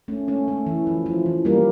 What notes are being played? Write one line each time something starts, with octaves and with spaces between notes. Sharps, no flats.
A3 C#4
A3 C#4
A3
E3
F3
F3
E3
G3 A#3